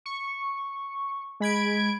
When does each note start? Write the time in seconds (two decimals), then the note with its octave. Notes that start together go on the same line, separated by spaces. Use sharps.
0.06 C#6
1.40 G#3 B5 G#6 D7